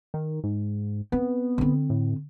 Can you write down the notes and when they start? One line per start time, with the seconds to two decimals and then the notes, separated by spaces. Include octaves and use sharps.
0.14 D#3
0.44 G#2
1.12 B3 C4
1.58 D3 C4
1.90 A2